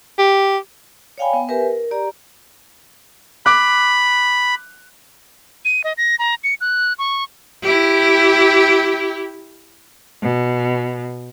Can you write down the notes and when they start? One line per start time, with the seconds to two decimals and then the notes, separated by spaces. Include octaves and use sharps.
0.18 G4
1.18 C#5 D5 F5 G5 G#5 B5
1.33 B3
1.47 G4 A#4 B4 E5 G#5
1.61 A#4
1.91 G4 D5 A#5
3.46 B5 D6 F#6
5.65 D#7
5.84 D#5
5.97 A#6
6.19 A#5
6.44 C#7
6.61 F#6
6.99 C#6
7.62 E4 G4
10.22 B2